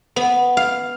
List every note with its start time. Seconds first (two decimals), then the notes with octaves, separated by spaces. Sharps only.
0.16 B3
0.57 F5